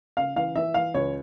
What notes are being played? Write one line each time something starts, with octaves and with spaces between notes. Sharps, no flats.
C#3 F5
E3 F5
E3 E5
E3 F5
C#2 C#5